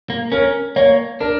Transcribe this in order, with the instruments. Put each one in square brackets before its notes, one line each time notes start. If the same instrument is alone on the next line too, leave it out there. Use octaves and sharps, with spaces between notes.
[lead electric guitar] A#3
[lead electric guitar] C#4 [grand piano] A#4
[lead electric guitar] A#3 [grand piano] C#5
[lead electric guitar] D4 [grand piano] A#4